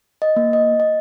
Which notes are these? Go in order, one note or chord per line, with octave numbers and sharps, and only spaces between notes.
D#5
A#3
D#5
D#5